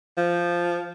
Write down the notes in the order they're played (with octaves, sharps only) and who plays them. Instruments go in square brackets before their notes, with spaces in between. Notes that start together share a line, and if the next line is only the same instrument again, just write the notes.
[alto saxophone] F3